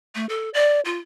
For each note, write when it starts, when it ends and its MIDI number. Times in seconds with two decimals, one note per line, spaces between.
0.15 0.26 57
0.29 0.49 69
0.54 0.80 74
0.85 0.98 65